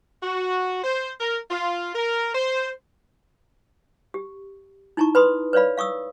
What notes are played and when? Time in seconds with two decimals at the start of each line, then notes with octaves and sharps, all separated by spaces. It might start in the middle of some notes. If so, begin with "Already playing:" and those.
0.23 F#4
0.84 C5
1.20 A#4
1.51 F4
1.95 A#4
2.35 C5
4.14 G4
4.97 D#4 E4 A5 A#5 C#6
5.15 B4 B5 C6 D#6
5.53 B4 C#5 D5 F5 B5
5.78 F5 C#6 D#6 E6